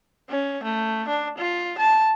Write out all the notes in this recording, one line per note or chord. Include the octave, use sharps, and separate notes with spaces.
C#4
A3
D4
F4
A5